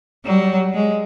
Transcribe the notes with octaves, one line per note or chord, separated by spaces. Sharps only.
F#3 G3
G#3